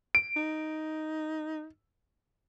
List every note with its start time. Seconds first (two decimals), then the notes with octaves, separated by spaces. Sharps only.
0.15 D7
0.36 D#4